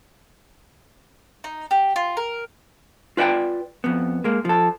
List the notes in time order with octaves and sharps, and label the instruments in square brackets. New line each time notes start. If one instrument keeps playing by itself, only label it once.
[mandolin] D#4
G4
F4
A#4
[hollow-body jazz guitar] F4 B4 D5 F#5 G5
F2 B3
G#3 A#3
F3 A4